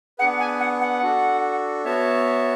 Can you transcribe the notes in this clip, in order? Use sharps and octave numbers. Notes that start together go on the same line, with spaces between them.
B3 D4 G#4 B4 F#5
G#5
F#5
F#5
D4 F#4 A4
B3 F#4 C#5 E5 A5